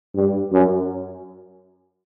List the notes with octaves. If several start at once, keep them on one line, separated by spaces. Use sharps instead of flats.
G2
F#2